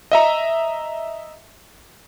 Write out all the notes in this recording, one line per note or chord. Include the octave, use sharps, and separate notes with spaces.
D#5 E5 A#5